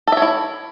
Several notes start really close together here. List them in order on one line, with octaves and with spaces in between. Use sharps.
A4 E5 C#5 E4